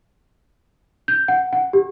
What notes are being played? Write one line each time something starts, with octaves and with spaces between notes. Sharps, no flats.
G6
F#5
F#5
G4